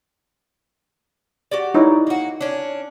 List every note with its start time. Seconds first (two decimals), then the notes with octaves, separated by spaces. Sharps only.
1.51 F#4 G4 D5
1.74 D#4 E4 C#5
2.07 A#3 F#4
2.41 C#4 D4